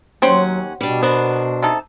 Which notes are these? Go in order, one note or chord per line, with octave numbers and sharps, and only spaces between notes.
D#2 F#3 C#4 C5 F#5 G5 C6
B2 G3 D4
B3 D4 A#4 C5
C3 D#4 A4